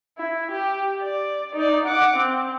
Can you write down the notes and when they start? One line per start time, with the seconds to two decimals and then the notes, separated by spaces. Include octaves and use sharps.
0.18 E4
0.51 G4
1.02 D5
1.55 D#4 D5
1.85 F#5 D6
2.16 C4